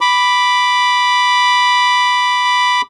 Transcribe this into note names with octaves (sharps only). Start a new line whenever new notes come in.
B5 D6